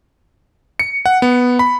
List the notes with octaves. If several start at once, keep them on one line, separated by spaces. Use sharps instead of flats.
C#7
F#5
B3
B5